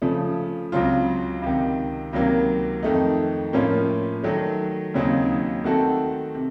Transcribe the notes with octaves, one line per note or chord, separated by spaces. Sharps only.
C#3 F3 A3
C#2 C#3 F#3 C4 F4
C#2 C3 D#3
C#2 C3 D#3 F#3 A#3
F2 D#3 A3 D#4
A2 F3 A#3 C#4 F4
D#3 F#3 A3
D#2 C#3 F#3 C4 D#4
D#3 A3 C4 F#4 A4
C3